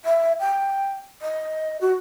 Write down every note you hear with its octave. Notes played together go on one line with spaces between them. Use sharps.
E5
G5
D#5
F#4